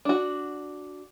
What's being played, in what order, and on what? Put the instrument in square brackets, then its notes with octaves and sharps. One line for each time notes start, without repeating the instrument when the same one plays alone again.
[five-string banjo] D4 F#4